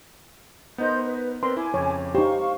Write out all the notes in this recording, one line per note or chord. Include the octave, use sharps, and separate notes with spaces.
B3 D#4 A#4 C5 D#5 G6
B4
C4 A#4 B4 D5 C6
E4 G#5 D6
F2 C#3 C#5
D#4 G4 C5 F5 C#6